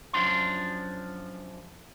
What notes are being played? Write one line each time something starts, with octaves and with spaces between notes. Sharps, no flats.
F#2 F3 D4 C6